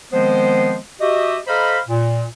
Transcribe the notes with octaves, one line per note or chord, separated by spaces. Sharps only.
D#3 F3 G#3 B3 C4 C5
F#4 G4 D#5 E5
A4 C5 D#5 F5 A#5 B5
A#2